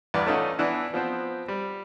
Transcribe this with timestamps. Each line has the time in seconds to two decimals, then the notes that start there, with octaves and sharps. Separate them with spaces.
0.14 E2 G2 B3 D5
0.26 A3 C#4 D#4 F4 F#5
0.59 E3 B3 D4 E4
0.94 F3 B3 C4
1.48 G3